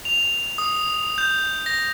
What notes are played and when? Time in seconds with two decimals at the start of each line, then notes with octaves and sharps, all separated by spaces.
0.05 F7
0.58 D#6
1.18 G6
1.66 A#6